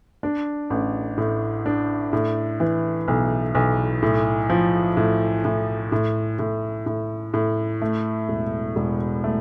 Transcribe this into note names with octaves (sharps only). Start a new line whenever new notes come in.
D4
A1
A2
D4
A2
E3
B1
B1
A2
F3
A2
A2
A2
A2
A2
A2
A3
E1
E1
A3